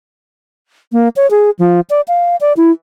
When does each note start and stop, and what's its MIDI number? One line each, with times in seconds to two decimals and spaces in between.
0.92 1.09 58
1.16 1.29 73
1.31 1.50 68
1.59 1.80 53
1.90 2.01 74
2.08 2.36 77
2.41 2.53 74
2.57 2.71 64